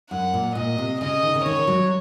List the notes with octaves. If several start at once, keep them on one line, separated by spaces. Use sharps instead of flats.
F#2 F#5
A#2
A#2 D#5
C3
C#3 D#5
D#3
C#3
D#3 C#5
F#3